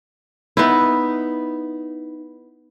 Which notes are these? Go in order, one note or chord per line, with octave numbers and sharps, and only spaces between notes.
B3 D#4 E4